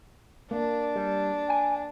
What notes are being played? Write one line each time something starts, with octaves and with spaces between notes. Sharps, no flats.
A#3 D4
G3
G5 G#5